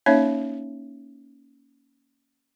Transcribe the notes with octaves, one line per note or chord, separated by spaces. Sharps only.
A#3 C#4 D#4 C#5 E5